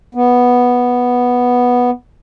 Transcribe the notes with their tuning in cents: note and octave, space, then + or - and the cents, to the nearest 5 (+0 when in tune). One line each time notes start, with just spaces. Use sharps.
B3 -5